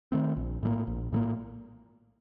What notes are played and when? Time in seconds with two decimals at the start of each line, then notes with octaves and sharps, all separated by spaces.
0.12 D#3 A3 C4
0.37 A#1
0.63 A2 F#3 A#3
0.87 A#1
1.13 A2 F#3 A#3